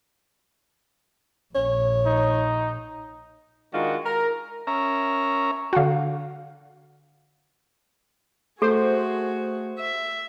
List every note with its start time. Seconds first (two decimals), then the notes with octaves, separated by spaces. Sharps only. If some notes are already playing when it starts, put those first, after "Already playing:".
1.55 A#1 C#5
2.06 D#4
3.74 D#3 G#3 D4 F4 F#4
4.06 A#4
4.67 C#4 A#4 E5 A#5
5.73 D3 F#4 F5 F#5
8.62 A3 F#4 G#4 A4 C5
9.78 E5